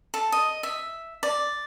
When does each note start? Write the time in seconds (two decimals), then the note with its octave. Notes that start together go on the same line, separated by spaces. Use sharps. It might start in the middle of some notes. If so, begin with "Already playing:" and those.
0.14 A4
0.32 D#5
0.63 E5
1.23 D5